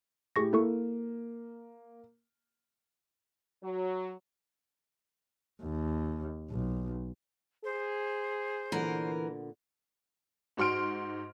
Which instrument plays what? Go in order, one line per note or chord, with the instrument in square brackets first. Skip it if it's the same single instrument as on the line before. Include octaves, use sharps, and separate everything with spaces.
[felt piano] A2 G4 [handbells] G#4 C#6 A#6
[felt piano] A#3 [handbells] E4 A4 C#6
[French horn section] F#3
[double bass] D#2
B1
[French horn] G#4 [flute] C5
[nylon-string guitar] A#2 D3 B3 [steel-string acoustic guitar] E3 A#4
[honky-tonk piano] G#2 F#4 C6 F6 D7